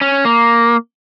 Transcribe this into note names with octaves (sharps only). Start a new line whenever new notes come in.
C#4
A#3